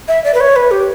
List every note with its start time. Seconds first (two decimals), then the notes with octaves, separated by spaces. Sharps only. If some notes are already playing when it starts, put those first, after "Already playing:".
0.08 E5
0.24 D5
0.34 B4
0.41 C#5
0.56 B4
0.71 G4